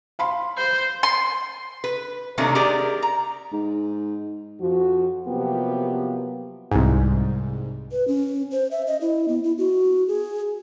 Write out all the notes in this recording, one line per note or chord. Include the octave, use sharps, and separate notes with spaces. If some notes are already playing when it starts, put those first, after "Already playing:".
F5 B5 C6
C5
C6
B4
C3 D#3 A3 A#3 C#4 D4
G4 G#4 A#4 D5
A#5
G#2
F2 F3 F#4
C3 F3 F#3 A#3 B3 G4
C2 G#2
B4
C#4
C5
E5
D#5
E4
B3
E4
F#4
G#4